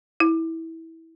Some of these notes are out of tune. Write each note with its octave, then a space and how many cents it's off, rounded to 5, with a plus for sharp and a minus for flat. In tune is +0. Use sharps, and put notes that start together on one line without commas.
E4 -15